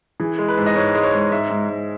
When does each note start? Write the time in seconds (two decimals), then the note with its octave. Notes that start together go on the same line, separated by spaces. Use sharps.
0.20 E3 G#4
0.38 G#3
0.48 B4
0.58 G#2
0.66 D#5
0.76 G#2 C#5
0.95 G#3
1.03 C#5
1.13 G#2
1.32 G#2 E5
1.50 G#2
1.69 G#2